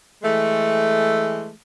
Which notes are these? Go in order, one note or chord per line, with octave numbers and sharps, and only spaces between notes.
E3 G#3 A3